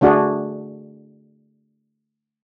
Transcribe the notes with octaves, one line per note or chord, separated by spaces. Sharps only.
D3 A3 D4 F#4 G#4